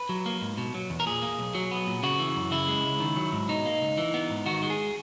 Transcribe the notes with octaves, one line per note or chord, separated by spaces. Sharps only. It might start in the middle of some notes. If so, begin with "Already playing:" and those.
Already playing: B4
F#3
A#3
G#2
B2
F#3
E2
A#4
A#2 G#4
A#3
B1
F#3
B3
A#2
C#3 F#4
E3
F#2
C#3 E4
G#3
C#2
D#3
F#3
G#2
B2 D#4
A#3
C#2
E3
B3
G#2
D#3 F#4
G#3
G#4